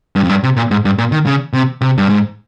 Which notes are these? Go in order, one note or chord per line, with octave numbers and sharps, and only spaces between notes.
G2
F2
G2
C3
A#2
G#2
G2
A#2
D#3
C#3
C3
C3
G2
G#2